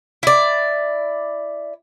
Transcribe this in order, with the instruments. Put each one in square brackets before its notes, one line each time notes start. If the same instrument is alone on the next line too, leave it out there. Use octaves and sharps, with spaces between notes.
[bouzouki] E4 D5